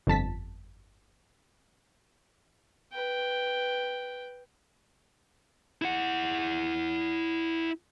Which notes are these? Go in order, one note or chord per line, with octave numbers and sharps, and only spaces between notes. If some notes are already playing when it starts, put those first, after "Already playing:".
G1 F2 A5 B6
B4 G5
E4 F#5